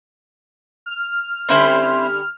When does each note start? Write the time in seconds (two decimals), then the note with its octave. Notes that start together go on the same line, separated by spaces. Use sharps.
0.86 F6
1.49 D3 G3 C4 C#4 E4 C5